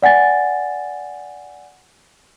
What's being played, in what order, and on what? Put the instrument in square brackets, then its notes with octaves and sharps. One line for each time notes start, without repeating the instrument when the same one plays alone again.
[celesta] D5 F#5 G#5 A6